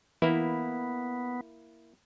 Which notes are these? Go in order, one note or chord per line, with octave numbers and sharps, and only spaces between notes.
E3 A#3 B3 E4